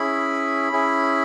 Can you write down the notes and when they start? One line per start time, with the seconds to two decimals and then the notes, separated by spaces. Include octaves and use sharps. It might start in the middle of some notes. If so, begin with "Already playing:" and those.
Already playing: C#4 E4 G#4 B5
0.72 C#4 E4 G#4